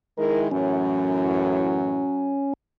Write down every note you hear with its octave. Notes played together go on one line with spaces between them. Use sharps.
D#3 G#3 E4 A#4
F#2 A2 E3 F#3 C#4